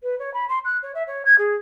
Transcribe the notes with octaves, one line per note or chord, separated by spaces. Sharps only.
B4
C#5
B5
C6
F#6
C#5
E5
C#5
G#6
G#4